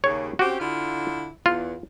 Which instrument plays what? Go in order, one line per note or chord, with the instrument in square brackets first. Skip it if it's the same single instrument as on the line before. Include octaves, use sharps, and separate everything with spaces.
[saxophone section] D#2 C#3 [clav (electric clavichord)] C#5
[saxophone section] C4 C#4 G4 [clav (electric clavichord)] F#4
[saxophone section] D3 E4 F4
[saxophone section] E2 [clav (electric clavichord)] F4